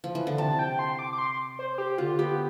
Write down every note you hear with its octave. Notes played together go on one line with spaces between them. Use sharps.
F3
E3
D3
C3 A5
G5
C6
D6
D6
C6
C5
G4
D3 F4
B3 G4